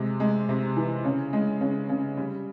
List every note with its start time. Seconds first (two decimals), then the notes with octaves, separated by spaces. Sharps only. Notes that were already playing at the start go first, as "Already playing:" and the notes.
Already playing: C3 G#3
0.20 G#3
0.49 C3
0.77 E3
1.05 C#3
1.33 G#3
1.61 C#3
1.89 C#3
2.17 G3